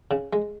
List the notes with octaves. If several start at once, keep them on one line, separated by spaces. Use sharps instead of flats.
C#3
G#3